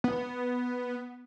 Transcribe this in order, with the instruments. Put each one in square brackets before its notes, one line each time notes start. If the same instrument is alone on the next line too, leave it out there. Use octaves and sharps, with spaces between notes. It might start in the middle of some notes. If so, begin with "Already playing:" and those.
[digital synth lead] B3